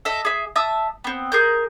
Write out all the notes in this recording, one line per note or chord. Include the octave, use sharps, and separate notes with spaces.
A4 D#5 E5
G#4 E5
E5 A5 D#6 E6
B3 C4
G#4 A#4 G6